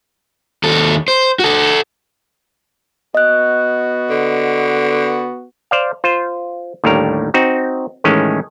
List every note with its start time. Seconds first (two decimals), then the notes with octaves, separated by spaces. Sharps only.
0.63 D#2 A4
1.08 C5
1.39 F#4 A4
3.15 B3 F#4 D#5 F#6
4.10 D3
5.71 C5 D5 F5
6.04 F4 C5
6.84 D#2 A2 D3 G3 A#4
7.34 C4 D#4 F#4
8.04 A2 D#3 E3 G#3 C#4